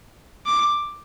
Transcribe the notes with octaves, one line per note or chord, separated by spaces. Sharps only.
D6